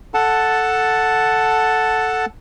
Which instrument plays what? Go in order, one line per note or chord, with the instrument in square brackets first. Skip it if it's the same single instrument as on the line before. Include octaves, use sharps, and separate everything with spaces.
[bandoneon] A4 F#5 A5